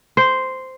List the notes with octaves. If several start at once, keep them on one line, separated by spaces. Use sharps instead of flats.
C5